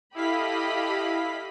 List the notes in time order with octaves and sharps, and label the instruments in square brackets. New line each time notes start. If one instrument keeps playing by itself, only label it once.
[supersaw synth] E4 F5 B6 [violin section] G4 A4 [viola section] D#5 B5